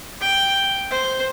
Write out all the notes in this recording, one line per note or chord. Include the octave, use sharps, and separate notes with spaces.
G5
C5